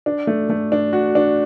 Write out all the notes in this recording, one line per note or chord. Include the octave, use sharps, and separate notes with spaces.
D4
A3
A3
D4
F#4
D4